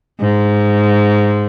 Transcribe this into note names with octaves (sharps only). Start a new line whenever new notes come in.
G#2